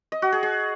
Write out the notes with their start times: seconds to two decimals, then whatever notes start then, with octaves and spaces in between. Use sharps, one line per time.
0.12 D#5
0.22 F#4
0.32 G#4
0.43 G#4